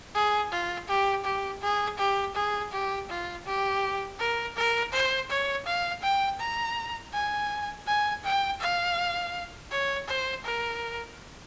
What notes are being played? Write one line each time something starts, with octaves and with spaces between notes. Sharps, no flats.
G#4
F4
G4
G4
G#4
G4
G#4
G4
F4
G4
A#4
A#4
C5
C#5
F5
G5
A#5
G#5
G#5
G5
F5
C#5
C5
A#4